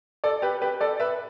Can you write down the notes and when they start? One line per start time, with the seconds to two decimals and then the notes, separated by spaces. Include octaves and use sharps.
0.24 A4 D5
0.42 G4 B4
0.62 G4 B4
0.81 A4 D5
1.00 B4 E5